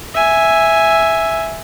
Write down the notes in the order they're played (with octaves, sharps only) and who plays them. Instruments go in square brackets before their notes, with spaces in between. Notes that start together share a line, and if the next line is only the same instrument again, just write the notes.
[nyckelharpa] E5 G#5